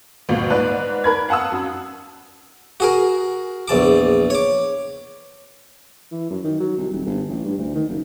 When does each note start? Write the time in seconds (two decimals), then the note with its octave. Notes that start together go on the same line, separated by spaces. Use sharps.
0.29 G1 D2 A#2 F4
0.50 G#2 B4 D5 F#6
1.04 A#4 B5 G#6
1.29 F5 F#5 A5 D#6 E6
1.52 F#2
2.80 F#4 G#4 A#4
3.68 A#1 E2 A5 D6
4.30 C#5 D6
6.12 E3
6.30 F#2
6.44 D#3
6.60 F#3
6.78 C2
6.92 D#1
7.06 G1
7.29 A1
7.45 G2
7.58 D2
7.75 D#3
7.88 F#1